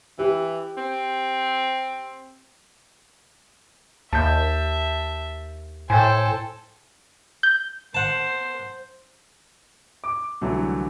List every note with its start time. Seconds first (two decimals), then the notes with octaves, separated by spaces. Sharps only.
0.19 E3 G4
0.77 C4
4.13 D#2 E5 A5 G6
5.90 A2 A4 C5 G5 G#5
7.43 G6
7.94 C5 F#5 A5
10.04 D6
10.41 C2 D3 E3 F#3 A3